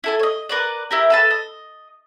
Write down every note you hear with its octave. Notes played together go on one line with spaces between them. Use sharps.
E4 A4 G#5
C#5 D#5
A#4 B4 D5
E4 G4 A#4
A4 B4 A5
D#5